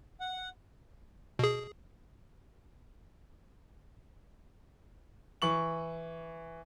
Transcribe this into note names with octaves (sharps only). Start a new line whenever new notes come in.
F#5
B2 G#4
E3 C#6 F#7